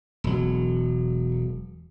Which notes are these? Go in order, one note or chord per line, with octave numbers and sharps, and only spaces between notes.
E1 F#3